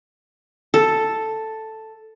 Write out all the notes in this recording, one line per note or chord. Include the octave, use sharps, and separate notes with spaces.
A4